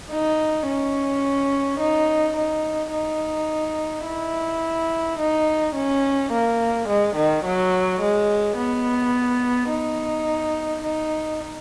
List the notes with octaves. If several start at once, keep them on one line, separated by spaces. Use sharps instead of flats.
D#4
C#4
D#4
D#4
D#4
E4
D#4
C#4
A#3
G#3
D#3
F#3
G#3
B3
D#4
D#4